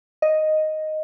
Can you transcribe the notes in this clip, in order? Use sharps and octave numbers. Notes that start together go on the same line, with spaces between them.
D#5